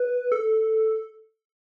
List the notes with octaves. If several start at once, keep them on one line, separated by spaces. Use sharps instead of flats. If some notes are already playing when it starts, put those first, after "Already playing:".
Already playing: B4
A4